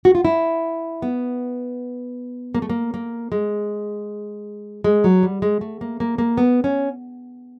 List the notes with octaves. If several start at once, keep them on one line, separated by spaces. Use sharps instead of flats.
F#4
F4
E4
B3
A#3
A3
A#3
A#3
G#3
G#3
F#3
G3
G#3
A3
A#3
A#3
A#3
B3
C#4